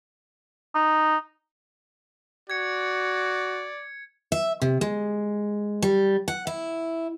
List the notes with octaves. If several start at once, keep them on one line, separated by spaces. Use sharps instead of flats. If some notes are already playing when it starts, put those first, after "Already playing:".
D#4
F#4 D5 G#6 C#7
E5
C3
G#3
G3
F#5
E4